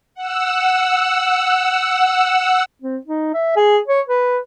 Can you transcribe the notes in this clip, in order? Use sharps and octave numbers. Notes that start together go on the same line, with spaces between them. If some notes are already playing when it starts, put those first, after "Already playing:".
F#5 E6
C4
D#4
E5
G#4
C#5
B4